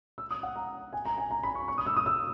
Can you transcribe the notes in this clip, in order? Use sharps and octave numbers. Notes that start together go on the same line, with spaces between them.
E6
D#6
F#5
A#5
G#5
A#5
G#5
A#5
B5
C#6
C#6
D#6
E6
D#6
E6